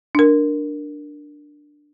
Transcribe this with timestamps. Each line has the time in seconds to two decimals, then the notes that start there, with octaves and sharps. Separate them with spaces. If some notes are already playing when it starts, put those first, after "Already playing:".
0.15 D4 A#4